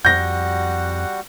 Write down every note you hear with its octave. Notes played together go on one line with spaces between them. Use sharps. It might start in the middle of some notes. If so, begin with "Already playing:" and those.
F2 G3 F#4 F#5 G6 A#6